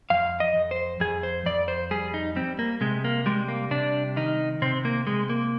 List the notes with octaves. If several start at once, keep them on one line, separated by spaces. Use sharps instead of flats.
F2 F5
D#5
F2
C5
F2 G#4
C5
F2 D5
C5
G3 G#4
D#4
G3 C4
A#3
C3 G#3
A#3
G3 G#3
A#3
C3 D4
D#3 D#4
C3 C4
A#3
C3 G#3
A#3